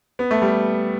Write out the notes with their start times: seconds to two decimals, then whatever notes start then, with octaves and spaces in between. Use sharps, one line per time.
0.19 B3
0.31 A3
0.42 G3